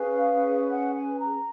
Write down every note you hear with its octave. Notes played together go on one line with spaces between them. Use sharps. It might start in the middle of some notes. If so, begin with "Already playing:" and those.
Already playing: C#4 G#4 B4 F5
F#5
G#5
A#5